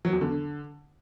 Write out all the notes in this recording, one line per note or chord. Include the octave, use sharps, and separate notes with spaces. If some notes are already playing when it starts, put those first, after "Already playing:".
F#3
E2
D3